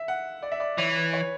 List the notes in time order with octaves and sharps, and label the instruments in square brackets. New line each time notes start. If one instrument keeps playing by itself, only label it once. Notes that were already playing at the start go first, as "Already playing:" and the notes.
Already playing: [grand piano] E5
F#5
D5
E5
D5
[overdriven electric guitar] E3 [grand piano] C#5
[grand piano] B4
C#5